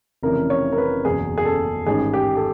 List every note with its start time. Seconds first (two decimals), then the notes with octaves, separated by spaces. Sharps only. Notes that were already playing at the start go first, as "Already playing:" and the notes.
0.23 F1 F2 C#3 E3 A#4
0.50 C#5
0.72 A#4
0.78 B4
1.05 F#1 E2 B2 G#4
1.38 G#4
1.45 A4
1.86 A1 G#2 D#3 G#4
2.14 G4
2.37 A4